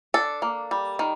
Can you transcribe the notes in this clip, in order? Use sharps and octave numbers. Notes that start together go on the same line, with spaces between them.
D4 A4
A#3
G3
D#3